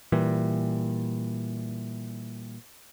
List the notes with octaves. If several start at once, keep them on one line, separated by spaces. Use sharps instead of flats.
A#2 E3 G3